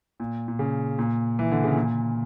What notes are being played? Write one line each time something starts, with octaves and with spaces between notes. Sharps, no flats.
A#2
A#2
C#3
A#2
E3
D3
C#3
A#2